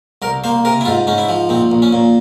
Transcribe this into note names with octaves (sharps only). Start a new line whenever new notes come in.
C2 A#4
A#3 C5
C3 A#4
E4
G#2 F4
G#2 C#4
E4
F3
A#1 C4
A#1
C#4
A#2